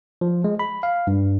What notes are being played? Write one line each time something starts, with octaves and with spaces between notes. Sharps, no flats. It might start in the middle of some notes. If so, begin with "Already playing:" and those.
F3
G#3
B5
F5
G2